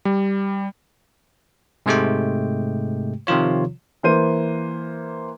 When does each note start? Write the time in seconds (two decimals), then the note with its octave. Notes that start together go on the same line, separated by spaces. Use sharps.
0.05 G3
1.86 G#2 C3 G#3 A3 G4 G5
3.27 C3 D#3 F3 F4 C#5
4.03 E3 A#3 C5 D#7